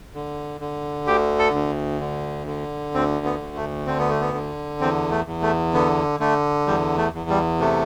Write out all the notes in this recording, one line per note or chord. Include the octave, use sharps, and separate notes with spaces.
D3
D3
D2 G4
A4
D2
D3
D3
D2 C4
B3
D2
A3
D3 C4
B3
A3
B3
D3
E2 C4
A3
E2
A3
D3 B3
D3 A3
E2 G3
A3
E2
G3
C3 A3